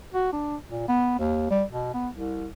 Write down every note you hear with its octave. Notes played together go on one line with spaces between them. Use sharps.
F#4
D4
A#2
B3
D#2
G3
B2
B3
C2